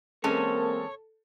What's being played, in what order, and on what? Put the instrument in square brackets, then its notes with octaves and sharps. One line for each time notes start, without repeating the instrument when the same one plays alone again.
[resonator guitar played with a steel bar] E2 G#3 C#4 [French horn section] A#3 C4 A#4 [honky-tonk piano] A4 [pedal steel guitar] C#5